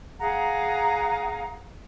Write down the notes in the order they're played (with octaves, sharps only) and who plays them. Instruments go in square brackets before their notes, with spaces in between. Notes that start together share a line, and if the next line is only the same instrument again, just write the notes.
[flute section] G#4 F5 F#5 A#5